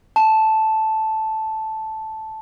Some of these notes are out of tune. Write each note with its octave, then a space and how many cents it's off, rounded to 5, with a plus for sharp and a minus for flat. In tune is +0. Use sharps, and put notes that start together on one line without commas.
A5 -5